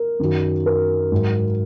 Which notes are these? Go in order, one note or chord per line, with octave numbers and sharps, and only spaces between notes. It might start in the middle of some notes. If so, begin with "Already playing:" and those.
Already playing: A#4
F#2 D#3 F#3
A#4
G#2 F#3